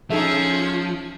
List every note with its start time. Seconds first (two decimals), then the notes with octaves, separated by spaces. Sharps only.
0.10 F3 C#4 D#4 G#4 A4 E5